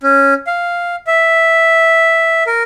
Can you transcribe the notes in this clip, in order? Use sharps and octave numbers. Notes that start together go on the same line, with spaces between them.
C#4
F5
E5
A#4